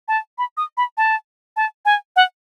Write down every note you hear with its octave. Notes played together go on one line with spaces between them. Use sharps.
A5
B5
D#6
B5
A5
A5
G#5
F#5